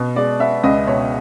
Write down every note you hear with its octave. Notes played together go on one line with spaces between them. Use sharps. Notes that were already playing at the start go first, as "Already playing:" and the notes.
Already playing: B2
G#3 D5
B3 E5
C#2 D#5
B2 C#5